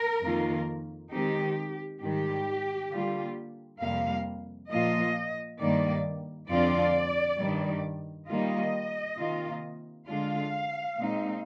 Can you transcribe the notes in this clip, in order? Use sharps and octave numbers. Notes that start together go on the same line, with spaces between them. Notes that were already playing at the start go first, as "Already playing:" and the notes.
Already playing: A#4
F2 D#3 A#3 F4
D#3 G#3 C4 D#4 G4
G#2 D#3 G3 G4
D3 G3 A#3 F4
F2 C3 G3 A#3 F5
A#2 F3 A#3 F4 D#5
G2 D#3 G3 A#3 D5
F2 D3 F3 C4 F4 D5
G2 D#3 G3
D#3 G3 A#3 F4 D#5
C3 D#3 A#3 F4
D3 G#3 D4 F4 F5
A#2 G#3 C4 D#4